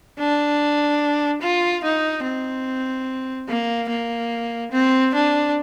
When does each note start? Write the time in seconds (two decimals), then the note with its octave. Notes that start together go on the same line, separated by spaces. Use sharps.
0.19 D4
1.42 F4
1.84 D#4
2.24 C4
3.49 A#3
3.90 A#3
4.72 C4
5.14 D4